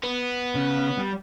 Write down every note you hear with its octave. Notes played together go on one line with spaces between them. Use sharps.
B3
C#3
G3